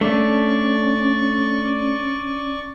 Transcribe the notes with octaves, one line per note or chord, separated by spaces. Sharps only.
A3 C#4 D4 D5 C#6